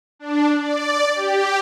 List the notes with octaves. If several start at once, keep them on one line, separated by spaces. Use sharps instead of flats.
D4
D5
G4